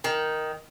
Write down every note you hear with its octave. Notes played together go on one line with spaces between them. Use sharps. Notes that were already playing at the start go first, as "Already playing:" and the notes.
D#3